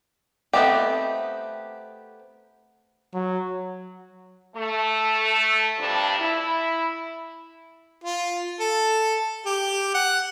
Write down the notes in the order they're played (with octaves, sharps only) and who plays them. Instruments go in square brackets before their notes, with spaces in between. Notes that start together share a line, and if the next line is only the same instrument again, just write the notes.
[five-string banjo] A3 B3 C4 D#4 G4
[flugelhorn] F#3
[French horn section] A3
G2 C3 F3 D4
E4
[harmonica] F4
A4
G4
F#5